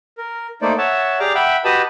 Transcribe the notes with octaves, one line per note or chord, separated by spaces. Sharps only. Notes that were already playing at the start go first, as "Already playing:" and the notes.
A#4
A3 A#3 D#4 C5 D5
C#5 E5 F#5 A5
G4 G#4 D5 A#5 D6 F6
E5 F#5 G5 B5
F#4 G4 B4 D#5 A5 B5